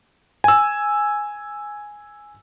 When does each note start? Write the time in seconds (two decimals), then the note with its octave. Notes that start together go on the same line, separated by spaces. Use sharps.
0.44 G#5 E6